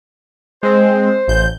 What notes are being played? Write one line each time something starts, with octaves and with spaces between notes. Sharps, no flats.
G#3 C4 C5
A1 G6